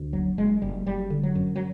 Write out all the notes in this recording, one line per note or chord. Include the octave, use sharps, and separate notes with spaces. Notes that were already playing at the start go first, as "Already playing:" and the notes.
Already playing: D2
F#1 F#3
F#1 G#3
F#1 G3
F#1 G3
D3
F#3
F#2
F#3